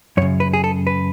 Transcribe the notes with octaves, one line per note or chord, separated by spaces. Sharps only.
F#2 C#3 C#5
B4
G#4
A4
B4